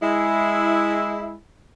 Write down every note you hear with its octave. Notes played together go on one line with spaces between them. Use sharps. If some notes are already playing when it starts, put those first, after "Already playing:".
G#3 E4